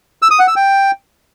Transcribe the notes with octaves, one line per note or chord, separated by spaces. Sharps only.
E6
D#6
F#5
E6
G5